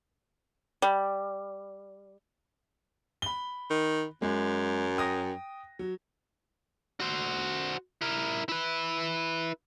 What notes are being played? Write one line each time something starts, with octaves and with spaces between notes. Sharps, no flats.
G3
B5 G7
D#3
F#2 G#3
G5 D#6 A#6
F#3
F#4 C5
E4 A#4
E4 B4